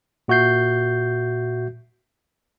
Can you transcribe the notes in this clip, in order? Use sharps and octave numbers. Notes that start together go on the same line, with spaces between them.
A#2 F#4 E5 G6 C7